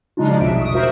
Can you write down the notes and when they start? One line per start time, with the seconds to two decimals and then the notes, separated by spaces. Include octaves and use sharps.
0.17 C#3 F#3 G#3 D4 D#4 F4
0.28 F3 G3 G#3
0.40 A#1 E2 B2 E5 D7
0.61 C#6 D#6
0.73 F4 F#4 A#4 C5 E5